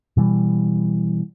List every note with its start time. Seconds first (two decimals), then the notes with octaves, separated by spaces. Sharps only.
0.17 B2 E3 G3